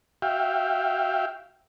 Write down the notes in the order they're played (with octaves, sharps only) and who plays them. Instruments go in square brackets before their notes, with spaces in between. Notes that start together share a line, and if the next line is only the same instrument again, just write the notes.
[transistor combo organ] F#4 E5 F5 G5